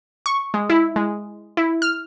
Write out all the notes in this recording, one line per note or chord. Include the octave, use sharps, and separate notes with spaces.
C#6
G#3
E4
G#3
E4
F6